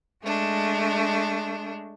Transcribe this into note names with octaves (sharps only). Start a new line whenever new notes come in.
G#3 A3 D4